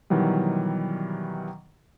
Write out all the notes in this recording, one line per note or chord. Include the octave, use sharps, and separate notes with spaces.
B2 D#3 E3 F#3 G3